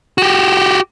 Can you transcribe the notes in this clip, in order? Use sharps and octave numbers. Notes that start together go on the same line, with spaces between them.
F#4 G4